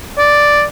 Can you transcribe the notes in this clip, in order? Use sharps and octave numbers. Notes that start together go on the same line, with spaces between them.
D5